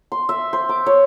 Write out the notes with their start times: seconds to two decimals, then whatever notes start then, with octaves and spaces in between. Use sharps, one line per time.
0.12 C6
0.29 E5
0.53 C5
0.69 D6
0.86 C#5